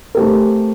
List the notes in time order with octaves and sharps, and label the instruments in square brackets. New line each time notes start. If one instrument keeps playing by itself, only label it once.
[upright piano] A3 C4 G4 A#4